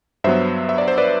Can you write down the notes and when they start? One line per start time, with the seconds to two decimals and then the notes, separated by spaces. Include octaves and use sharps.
0.24 G2 F#3 B3 C5 E5
0.69 E5
0.78 D5
0.88 C5
0.98 B4 D5